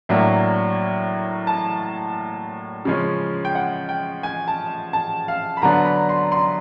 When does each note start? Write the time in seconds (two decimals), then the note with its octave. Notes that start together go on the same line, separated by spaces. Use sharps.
0.09 A2 F#3 A#3 D4 E5
1.47 A5
2.85 C#3 F3 G#3 C#4
3.45 G5
3.55 F#5
3.89 G5
4.23 G#5
4.48 A5
4.93 A5
5.28 F5
5.57 B5
5.62 D3 F#3 B3 D4 A#5
5.85 B5
6.09 C6
6.32 C6